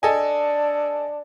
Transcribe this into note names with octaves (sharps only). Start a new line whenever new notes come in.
D4 A4 D#5 G#5